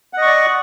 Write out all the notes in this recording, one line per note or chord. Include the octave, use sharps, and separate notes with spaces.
D5 D#5 F#5 C#6